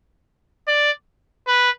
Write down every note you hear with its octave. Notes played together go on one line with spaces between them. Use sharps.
D5
B4